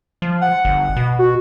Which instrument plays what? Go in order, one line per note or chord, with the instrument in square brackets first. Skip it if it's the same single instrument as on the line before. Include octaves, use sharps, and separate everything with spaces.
[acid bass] F3
[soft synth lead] F#5
[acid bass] G1
B2
[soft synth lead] F#4